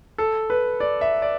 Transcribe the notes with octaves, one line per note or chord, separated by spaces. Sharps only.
A4
B4
D5
E5
D5